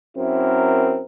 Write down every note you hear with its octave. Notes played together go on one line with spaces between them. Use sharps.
F#2 C4 E4 A#4